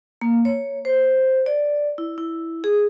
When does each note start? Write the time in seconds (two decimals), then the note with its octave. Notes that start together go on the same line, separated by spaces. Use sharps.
0.21 A#3
0.45 C#5
0.85 C5
1.46 D5
1.98 E4
2.18 E4
2.64 G#4